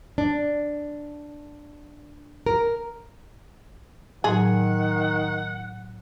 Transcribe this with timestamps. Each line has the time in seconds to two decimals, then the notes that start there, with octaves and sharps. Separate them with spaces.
0.18 D4
2.46 A#4
4.24 A2 D#3 F#3 G#4 F#5 C6